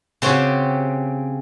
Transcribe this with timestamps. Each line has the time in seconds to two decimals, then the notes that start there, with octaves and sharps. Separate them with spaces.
0.22 C#3 C4 C#4 F#4 G4